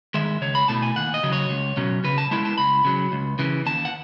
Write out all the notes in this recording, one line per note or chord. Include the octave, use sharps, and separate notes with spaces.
D#3 G#3 E5
C#2 C#5
B5
B2 A3 E4 A5
G#5
D#2 F#5
D#5
C#3 F#3
C#5
C#2
B2 F#3 C#4
C#3 B4
A5
G#3 B3 E4 A5
A5
C#2 B5
C#3 F#3
C#2
C#3 E3
D#2 A5
F#5